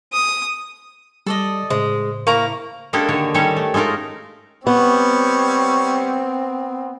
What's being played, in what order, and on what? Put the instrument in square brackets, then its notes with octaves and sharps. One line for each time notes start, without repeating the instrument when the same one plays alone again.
[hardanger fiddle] D#6
[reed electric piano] G3 A5 [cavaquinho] A4 D5 D#5
[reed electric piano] A2 C#3 C5 [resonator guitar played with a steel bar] G#3 [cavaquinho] D#6
[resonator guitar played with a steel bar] A#3 [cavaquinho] E4 A#5 C#6
[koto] G#3 A#3 C#4 D4 G4 A4
D3 D#3 C#5
D#3 G3 C#4 G4 A4 C#5
A3
G#3 A3 D#4 F4 A#4
[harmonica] G3 C#5 [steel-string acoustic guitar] B3 [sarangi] C4